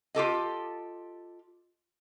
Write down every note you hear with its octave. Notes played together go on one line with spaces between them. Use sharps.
F4 G4 A4 D#5